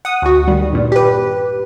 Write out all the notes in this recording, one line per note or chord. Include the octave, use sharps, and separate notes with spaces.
F#5 D#6
D2 F#4
D#3 G3
G2 A#2
G4 B4